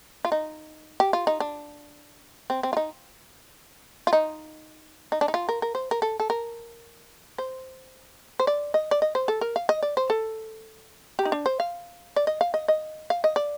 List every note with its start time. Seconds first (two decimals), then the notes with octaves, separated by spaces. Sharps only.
0.25 F4
0.32 D#4
1.00 G4
1.13 F4
1.27 D#4
1.40 D4
2.50 C4
2.63 C4
2.73 F4
2.77 D#4
4.07 F4
4.13 D#4
5.12 D#4
5.21 D4
5.28 D#4
5.34 F4
5.49 A#4
5.62 A#4
5.75 C5
5.91 A#4
6.02 A4
6.20 A4
6.30 A#4
7.38 C5
8.40 C5
8.47 D5
8.74 D#5
8.91 D5
9.02 D#5
9.15 C5
9.28 A4
9.41 A#4
9.56 F5
9.69 D#5
9.83 D5
9.97 C5
10.10 A4
11.19 G4
11.25 D#4
11.32 D4
11.46 C5
11.60 F5
12.16 D5
12.27 D#5
12.41 F5
12.54 D#5
12.68 D#5
13.10 F5
13.24 D#5
13.36 D5